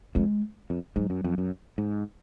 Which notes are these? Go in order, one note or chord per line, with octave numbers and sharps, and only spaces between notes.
F2 G#3
F2
G#2 F#3
F#2
F2
F#2
G#2